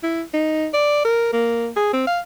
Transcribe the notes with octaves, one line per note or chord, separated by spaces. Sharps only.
E4
D#4
D5
A#4
A#3
G#4
C4
F5